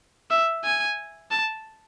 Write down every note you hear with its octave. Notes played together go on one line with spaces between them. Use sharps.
E5
G#5
A5